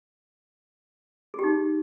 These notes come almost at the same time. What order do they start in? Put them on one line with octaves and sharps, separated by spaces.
G#4 G4 D#4